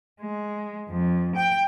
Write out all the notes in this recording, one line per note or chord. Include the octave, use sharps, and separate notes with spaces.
G#3
F2
G5